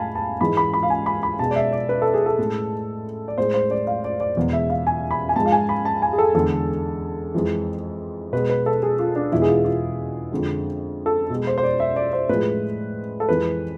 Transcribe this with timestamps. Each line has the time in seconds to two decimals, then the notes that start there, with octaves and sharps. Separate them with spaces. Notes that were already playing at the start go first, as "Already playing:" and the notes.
Already playing: A2 G#3 F5 G#5 A5 B5
0.15 A5
0.41 G#2 E3 G#3 B5
0.57 B5
0.74 B5
0.83 F5
0.90 G#5
1.06 B5
1.23 B5
1.39 B2 G#3 A5
1.51 D5
1.56 E5
1.72 D5
1.89 B4
2.02 A4
2.14 G#4
2.26 A4
2.39 A2 G#3
3.28 D5
3.38 A2 G#3 C5
3.54 C5
3.71 D5
3.87 F5
4.04 D5
4.20 D5
4.37 E2 B2 G#3
4.53 E5
4.70 F5
4.87 G#5
5.11 B5
5.29 G#5
5.36 G#2 F3 G#3 A5
5.46 F5
5.52 G#5
5.69 B5
5.85 A5
6.02 G#5
6.13 G#4
6.18 A4
6.35 E2 D3 G#3 A4
7.34 F2 E3 G#3
8.33 B2 G#3 B4
8.50 B4
8.66 A4
8.83 G#4
8.99 F4
9.16 D4
9.32 E2 B2 G#3 E4
9.42 G#4
9.48 F4
9.65 F4
10.31 F2 D3 G#3
11.06 A4
11.30 B2 G#3
11.47 C5
11.58 C5
11.63 D5
11.80 E5
11.96 D5
12.13 C5
12.29 A2 F3 G#3 B4
13.20 A4
13.28 F2 E3 G#3 B4